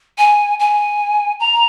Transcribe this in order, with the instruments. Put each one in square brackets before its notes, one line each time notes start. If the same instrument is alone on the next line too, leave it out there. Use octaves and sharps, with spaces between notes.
[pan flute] G#5
G#5
A#5